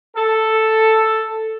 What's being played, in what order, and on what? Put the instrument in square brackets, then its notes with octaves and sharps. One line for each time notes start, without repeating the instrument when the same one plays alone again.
[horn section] A4